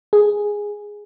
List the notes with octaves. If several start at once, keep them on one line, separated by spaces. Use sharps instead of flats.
G#4